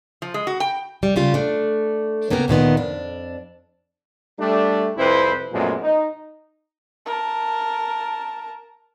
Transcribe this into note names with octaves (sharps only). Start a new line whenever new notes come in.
F3
G#3
F#4
G5
G3
C#3 G3 F4
A3 D4
C#3 A#3 B3 G4 G#4 A#4
D2 A#2 D#3 B3
F2 D4
G3 A3 D4
C2 F2 C4 E4 B4 C5
F#2 A#2 F3 G#3 A3 B3
D#4
A#4 A5